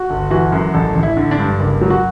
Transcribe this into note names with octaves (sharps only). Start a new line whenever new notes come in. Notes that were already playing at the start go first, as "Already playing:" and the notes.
Already playing: F#4
G1
E3 F#4
F#2
A1 A4
A1
E4
D3
D4
G2
F#1
F#3
F#4